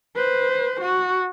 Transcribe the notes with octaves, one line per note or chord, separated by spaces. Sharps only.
B4 C5
F#4